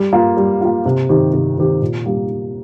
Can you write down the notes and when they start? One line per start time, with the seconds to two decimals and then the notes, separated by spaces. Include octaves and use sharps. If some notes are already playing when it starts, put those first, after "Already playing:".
Already playing: G3
0.13 A#3 F4
0.37 G3
0.61 A#3 F4
0.86 C3
1.09 D#3 C4 G4
1.34 C3
1.57 D#3 C4 G4
1.82 A#2
2.06 G3 A#3 G4